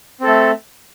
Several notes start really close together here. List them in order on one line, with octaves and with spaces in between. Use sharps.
C4 A4 A3